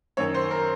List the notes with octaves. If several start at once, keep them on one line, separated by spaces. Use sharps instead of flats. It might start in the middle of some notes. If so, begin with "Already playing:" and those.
F#2 D#3 C#5
C5
A#4